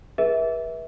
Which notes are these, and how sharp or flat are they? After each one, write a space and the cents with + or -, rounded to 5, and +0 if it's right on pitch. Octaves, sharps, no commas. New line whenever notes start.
G#4 +0 B4 -35 E5 -20